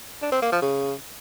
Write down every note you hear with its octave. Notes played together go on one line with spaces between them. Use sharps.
D4
C4
A#3
F3
C#3